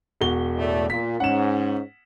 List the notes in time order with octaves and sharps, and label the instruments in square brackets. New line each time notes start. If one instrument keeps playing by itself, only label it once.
[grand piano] E1 F#4 G7
[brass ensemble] A2 A3 D5
[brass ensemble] A#2 [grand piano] B6
[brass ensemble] G#2 C#4 [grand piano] F#5 E7